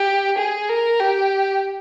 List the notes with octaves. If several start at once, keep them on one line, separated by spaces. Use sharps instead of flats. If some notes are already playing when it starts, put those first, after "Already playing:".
Already playing: G4
G#4
A#4
G4